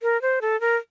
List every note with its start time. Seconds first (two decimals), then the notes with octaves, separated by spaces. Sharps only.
0.02 A#4
0.22 C5
0.41 A4
0.61 A#4